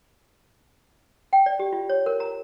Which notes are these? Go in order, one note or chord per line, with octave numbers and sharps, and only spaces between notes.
G5
D5
G4
F4
C#5
A#4
A#5